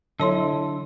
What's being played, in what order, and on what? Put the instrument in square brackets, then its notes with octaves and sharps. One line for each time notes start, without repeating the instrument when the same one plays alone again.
[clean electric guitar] D3 [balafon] F#3 C#5 [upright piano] E4 A4 [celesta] A5 C6